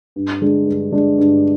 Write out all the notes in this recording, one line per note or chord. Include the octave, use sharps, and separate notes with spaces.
G2
D3 G#3 D4
G2
D3 G#3 D4
G2